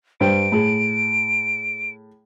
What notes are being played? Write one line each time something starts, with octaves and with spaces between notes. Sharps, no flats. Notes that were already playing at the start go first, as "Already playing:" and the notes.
G2 C5 G5 D7
A2 G#4